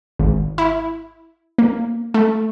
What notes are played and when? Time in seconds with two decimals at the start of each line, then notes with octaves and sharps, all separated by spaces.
0.19 G#1
0.58 E4
1.58 A#3
2.14 A3